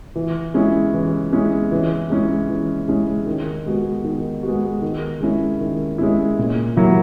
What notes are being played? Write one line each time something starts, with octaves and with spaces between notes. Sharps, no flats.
E3
G#3 C#4 E4
E3
G#3 C#4 E4
E3
G#3 C#4 E4
E3
G#3 C#4 E4
D#3
G#3 B3 F#4
D#3
G#3 B3 F#4
D#3
G#3 C#4 E4
D#3
G#3 C#4 E4
A#2
F#3 A#3 E4